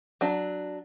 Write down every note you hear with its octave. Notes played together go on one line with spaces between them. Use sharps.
F#3 D4